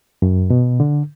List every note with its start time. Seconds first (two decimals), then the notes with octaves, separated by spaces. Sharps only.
0.22 F#2
0.50 B2
0.80 D3